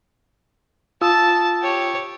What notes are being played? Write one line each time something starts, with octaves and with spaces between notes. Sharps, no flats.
F4 A5 D#6 E6
G4 C#5